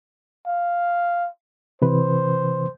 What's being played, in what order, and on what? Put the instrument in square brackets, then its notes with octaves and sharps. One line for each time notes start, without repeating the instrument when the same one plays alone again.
[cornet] F5
[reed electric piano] C3 E3 B4 [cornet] C5